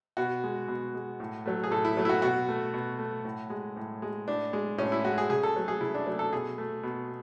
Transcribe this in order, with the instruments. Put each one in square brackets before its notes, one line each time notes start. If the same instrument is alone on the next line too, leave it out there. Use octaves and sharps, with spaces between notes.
[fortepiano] B2 F#4
G#3
B2
G#3
A2
F#3 A3
G#4
A2 A4
E4
F#3 A3
E4
F#4
B2 F#4
A3
B2
A3
A2
G#3
A2
G#3
A2 D4
G#3
A2 C#4
E4
G#3 F#4
G#4
C#3 G#4
A4
F#3 A3
G#4
C#3 E4
D4
F#3 A3
A4
B2 G#4
A3
B2